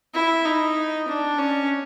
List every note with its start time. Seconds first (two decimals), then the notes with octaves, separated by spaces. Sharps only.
0.14 E4
0.46 D#4
1.08 D4
1.39 C#4